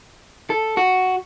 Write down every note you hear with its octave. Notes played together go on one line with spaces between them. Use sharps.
A4
F#4